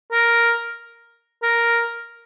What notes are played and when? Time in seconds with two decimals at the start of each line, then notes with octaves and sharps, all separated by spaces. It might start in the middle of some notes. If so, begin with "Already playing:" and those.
0.12 A#4
1.43 A#4